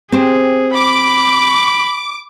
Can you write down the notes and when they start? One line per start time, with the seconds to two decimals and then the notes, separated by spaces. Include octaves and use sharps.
0.12 C4 G4 G#4 C5
0.75 B5 D6